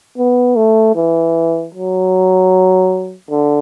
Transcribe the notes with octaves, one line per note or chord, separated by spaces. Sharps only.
B3
A3
E3
F#3
D3